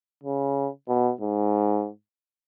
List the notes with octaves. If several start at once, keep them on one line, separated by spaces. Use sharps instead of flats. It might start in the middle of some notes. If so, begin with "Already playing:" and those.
C#3
B2
G#2